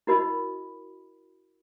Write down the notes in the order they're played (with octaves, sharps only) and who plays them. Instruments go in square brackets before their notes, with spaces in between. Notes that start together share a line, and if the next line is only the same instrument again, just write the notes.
[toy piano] E4 F#4 A#4 D#5 B5